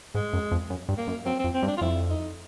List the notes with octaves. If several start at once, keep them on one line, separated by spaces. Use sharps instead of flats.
G#2 G#3
F#2
F2
F#2
G2
A#3
F#2
F#2 C4
C4
F2
C4
G2
D4
F4
F2 E4
D#4